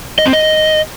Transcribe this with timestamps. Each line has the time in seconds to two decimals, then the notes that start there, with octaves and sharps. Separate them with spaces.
0.19 D#5
0.26 C4
0.33 D#5